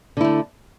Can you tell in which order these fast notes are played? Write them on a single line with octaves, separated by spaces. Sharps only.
D3 E4 A3